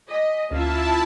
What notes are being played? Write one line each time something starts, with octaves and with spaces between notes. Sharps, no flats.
D#5 G#5 D6 B6
D2 A#3 C#4 E4 F4 E5 A5